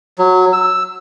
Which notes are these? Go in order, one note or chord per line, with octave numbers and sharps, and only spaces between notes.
F#3
E6